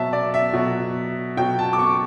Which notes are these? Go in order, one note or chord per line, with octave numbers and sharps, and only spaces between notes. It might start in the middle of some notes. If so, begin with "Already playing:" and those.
Already playing: B2 F#3 E5 A5
D5
E5
B2 F#3
B2 F#3 G5
A5
D6
C#6